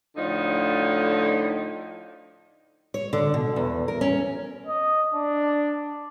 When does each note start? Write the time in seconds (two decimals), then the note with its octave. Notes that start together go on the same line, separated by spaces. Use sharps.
0.17 A2 D3 F3 D#4
2.94 C#5
3.13 D3
3.34 B2
3.56 E2
3.88 A#4
4.01 C#4
4.67 D#5
5.14 D4